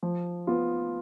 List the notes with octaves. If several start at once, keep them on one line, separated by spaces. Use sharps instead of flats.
F3
B3 F4